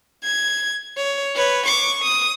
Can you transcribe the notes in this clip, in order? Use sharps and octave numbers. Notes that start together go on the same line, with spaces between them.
G#6
C#5
B4 C#5
C#6 D6
D#6